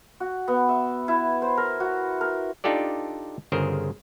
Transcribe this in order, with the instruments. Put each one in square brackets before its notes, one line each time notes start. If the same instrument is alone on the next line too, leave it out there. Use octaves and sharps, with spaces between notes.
[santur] F#4
B3
E5
E4
C5
A#4
F#4
A#4
[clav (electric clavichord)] D4 D#4 F4 G4 A4 D5
G1 C#3 G#4 A#4 C5